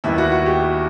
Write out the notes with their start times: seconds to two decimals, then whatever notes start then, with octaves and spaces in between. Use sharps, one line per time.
0.04 D#2 D#3 G3 B3 E4
0.18 F#4
0.31 F#4
0.46 G4